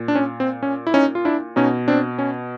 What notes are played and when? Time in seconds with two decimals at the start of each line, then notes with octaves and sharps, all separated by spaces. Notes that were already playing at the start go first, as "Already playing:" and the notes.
Already playing: A#2
0.08 D4
0.15 C#4
0.40 C4
0.63 C#4
0.87 E4
0.94 C#4 D#4
1.15 F4
1.25 D4 E4
1.56 B2 C#4 D#4
1.88 C4 D4
2.19 C#4